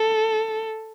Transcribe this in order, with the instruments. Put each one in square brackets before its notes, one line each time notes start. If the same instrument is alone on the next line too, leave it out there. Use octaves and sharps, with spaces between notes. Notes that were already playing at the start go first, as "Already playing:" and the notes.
Already playing: [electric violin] A4